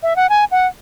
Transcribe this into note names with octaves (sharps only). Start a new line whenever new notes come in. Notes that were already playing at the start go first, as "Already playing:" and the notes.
E5
F#5
G#5
F#5